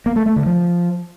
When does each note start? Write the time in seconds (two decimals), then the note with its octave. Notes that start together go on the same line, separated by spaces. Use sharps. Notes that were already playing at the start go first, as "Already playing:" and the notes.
0.06 A#3
0.16 A3
0.26 A3
0.36 D3
0.46 F3